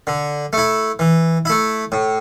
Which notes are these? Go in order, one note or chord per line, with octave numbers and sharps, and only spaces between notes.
D3
A3 E4
E3
A3 E4
A2